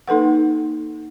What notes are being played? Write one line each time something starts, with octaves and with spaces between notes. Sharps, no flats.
A#3 D#4 A4 B4 F#5